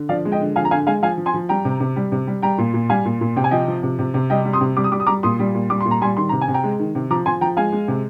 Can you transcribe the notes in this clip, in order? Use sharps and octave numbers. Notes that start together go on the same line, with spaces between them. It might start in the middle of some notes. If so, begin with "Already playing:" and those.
Already playing: D3
F3 D5 F5
G#3
D#5 G5
D3
F3 F5 G#5
A#5
D3 F5 G#5
G#3 F5 G#5
F3 F5 G#5
F3
G#5 C6
F3
G3 G5 A#5
C3
C3
G3
C3
G3
G3 G5 A#5
A#2
A#2
G3 F5 G#5
A#2
A#2
C3 G5
G#5
F3 D#5 G5
F3
C3
C3
C3
G3 D#5 G5
G3
C6 D#6
C3
G3 D6
D#6
G3 D6
D#6
G3 A#5 D6
A#2 C6 D#6
G3
A#2
G3 D6
A#2 C6
A#5
G3 G#5 C6
D#3 C6
C3 A#5
G#5
C3
G5 A#5
G#3
D#3
C3
F3 A#5 D6
F3 G#5 C6
F3 G5 A#5
G#3 F5 G#5
G#3
C3